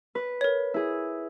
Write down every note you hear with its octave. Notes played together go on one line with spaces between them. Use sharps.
B4
A#4 C#5
E4 G#4